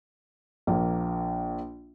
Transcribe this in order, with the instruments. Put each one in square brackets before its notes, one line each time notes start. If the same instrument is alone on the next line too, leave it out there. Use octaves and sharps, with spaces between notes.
[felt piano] A#1 A#3